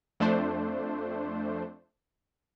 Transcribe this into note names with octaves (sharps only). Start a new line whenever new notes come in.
F2 A3 D4 C5